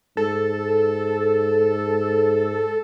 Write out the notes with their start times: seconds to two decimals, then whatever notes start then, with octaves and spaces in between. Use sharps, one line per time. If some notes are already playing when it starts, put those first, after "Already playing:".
0.17 G#2 A4